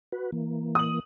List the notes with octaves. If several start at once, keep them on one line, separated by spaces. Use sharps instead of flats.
F#4 B4
E3 A#3
D#6 F#7